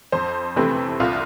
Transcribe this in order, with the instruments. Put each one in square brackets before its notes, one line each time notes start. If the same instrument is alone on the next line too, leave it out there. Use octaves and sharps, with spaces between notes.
[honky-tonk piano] F2 C5
C3 E3 A3 C4 B4
C2 F4